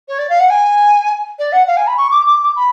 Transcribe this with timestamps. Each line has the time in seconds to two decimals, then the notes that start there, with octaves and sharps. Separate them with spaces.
0.08 C#5
0.18 D5
0.29 F5
0.40 F#5
0.50 G#5
1.39 D5
1.52 F#5
1.67 F5
1.77 G#5
1.87 B5
1.97 C#6
2.11 D6
2.27 D6
2.43 D6
2.56 B5